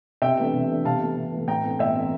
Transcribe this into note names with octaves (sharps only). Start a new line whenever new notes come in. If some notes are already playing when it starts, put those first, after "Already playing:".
C3 E5 G5
E3 A3 D4
C3
E3 A3 D4
C3 F5 A5
E3 A3
C3
E3 A3
A2 G5 A#5
E3 A3 C4
A2 E5 G5
E3 A3 C4